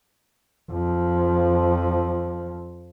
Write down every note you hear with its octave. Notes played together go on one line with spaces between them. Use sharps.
F2 F3